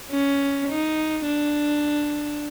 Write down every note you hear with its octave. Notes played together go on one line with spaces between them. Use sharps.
C#4
D#4
D4